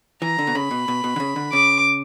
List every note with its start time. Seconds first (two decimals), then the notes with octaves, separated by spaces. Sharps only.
0.22 E3 A#5
0.39 D3
0.47 B2
0.55 C#3 B5
0.71 B2
0.88 B2
1.04 B2
1.16 D3
1.20 C#3
1.36 D3
1.52 C#3 D6